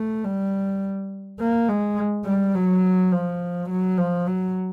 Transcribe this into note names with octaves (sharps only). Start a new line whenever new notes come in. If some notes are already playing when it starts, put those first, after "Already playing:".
Already playing: A3
G3
A#3
G#3
G3
F#3
F3
F#3
F3
F#3